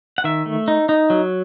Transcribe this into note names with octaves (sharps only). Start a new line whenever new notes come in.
F#5
D#3 E5
A3
D#4
D#4
F#3